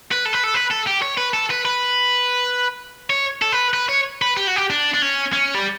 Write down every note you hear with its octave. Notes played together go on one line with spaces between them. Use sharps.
B4
A4
B4
A4
B4
A4
G4
C#5
B4
A4
B4
B4
C#5
A4
B4
B4
C#5
B4
G4
F#4
G4
D4
D4
C#4
C#4
G3